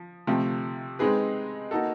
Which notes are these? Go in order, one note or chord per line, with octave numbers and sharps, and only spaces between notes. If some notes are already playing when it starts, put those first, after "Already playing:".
Already playing: F3
C3 F3 A3 C4
G#3 C4 D#4 G#4 B4
A#3 D#4 F#4 A4